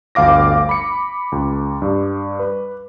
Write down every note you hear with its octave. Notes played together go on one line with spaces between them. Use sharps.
G1 D2 F5 D6 A#6
B5 C#7
C#2
G2
B4